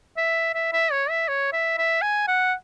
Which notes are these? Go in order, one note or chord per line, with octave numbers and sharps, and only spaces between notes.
E5
E5
E5
C#5
E5
C#5
E5
E5
G#5
F#5